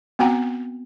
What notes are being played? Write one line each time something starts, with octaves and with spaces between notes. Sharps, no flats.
B3 C4 F#4 F#5 G5 A#5